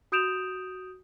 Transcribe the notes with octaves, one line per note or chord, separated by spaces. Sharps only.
F#4 D#6 G6 D7 E7 F7